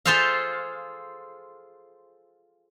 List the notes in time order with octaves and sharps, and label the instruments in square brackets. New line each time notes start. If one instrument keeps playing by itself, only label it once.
[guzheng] F4 G#4 A4 C5 E5 F5